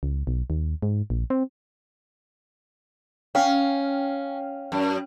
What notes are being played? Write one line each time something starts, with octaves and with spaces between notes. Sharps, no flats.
C#2
B1
D#2
G#2
A#1
C4
C#4 F5 G5
F#2